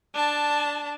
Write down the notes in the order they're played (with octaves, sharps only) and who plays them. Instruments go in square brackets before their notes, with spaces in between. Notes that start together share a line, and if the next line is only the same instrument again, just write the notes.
[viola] D4 A5